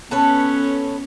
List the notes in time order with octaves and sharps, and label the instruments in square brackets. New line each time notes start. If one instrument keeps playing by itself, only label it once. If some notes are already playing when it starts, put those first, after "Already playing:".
[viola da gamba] B3 C#4 [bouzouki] A4 B4 C#5